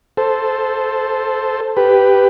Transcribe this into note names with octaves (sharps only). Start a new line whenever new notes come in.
A4 C5
G4 B4